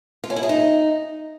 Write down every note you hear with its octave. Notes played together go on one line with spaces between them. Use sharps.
F4
C#4
E4
G#4
D#4